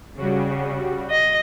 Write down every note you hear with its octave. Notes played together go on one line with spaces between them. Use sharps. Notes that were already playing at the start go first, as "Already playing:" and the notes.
C#3 G3 F#4
D#5